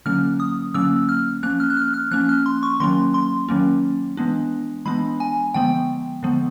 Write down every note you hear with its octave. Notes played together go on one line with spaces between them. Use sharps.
D3 F#3 A#3 C#4 F6
D#6
D3 F#3 A#3 C#4 E6
F6
F3 A#3 C#4 F#6
F6
F#6
F6
F6
F3 A#3 C#4 F#6
F6
C6
C#6
D#3 F#3 A#3 C#4 C6
C6
D#3 F#3 A#3 C#4
E3 G#3 B3 D4
E3 G#3 B3 D4 B5
G#5
D3 F3 G#3 B3 G5
D3 F3 G#3 B3